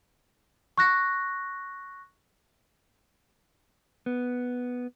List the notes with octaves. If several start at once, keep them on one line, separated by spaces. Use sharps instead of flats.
C#6 F#6 A#6
B3